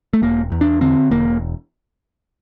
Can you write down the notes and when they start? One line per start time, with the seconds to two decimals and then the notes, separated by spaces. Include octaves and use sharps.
0.13 A3
0.22 E1 A#3
0.52 E2
0.61 D4
0.81 D3 C4
1.11 E1 A#3